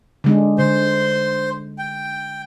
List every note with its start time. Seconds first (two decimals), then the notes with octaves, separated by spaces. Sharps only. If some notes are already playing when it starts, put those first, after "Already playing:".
0.24 D3 G#3 D4
0.58 D3 C5 C6
1.78 G5